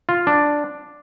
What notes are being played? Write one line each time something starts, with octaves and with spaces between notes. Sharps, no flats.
F4
D4